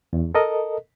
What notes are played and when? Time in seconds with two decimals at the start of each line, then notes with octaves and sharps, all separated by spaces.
0.13 E2
0.35 A4 A#4 D#5